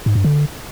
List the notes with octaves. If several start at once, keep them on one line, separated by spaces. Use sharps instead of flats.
G#2
G2
D3